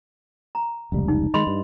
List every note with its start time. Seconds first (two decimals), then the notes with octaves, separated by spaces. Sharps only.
0.55 A#5
0.92 F1 C#2 G3
1.08 D#4
1.34 D#3 G#3 D#5 B5 C6
1.47 G2